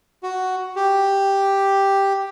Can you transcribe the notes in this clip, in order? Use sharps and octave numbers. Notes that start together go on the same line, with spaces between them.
F#4
G4